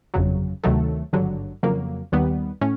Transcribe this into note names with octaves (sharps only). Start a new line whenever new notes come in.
G1 F2 C#3 F#3
D2 C3 D#3 F#3 A3
G#1 G2 D3 F#3
F2 C#3 F#3 A#3
D#2 D#3 G3 B3
A2 C#4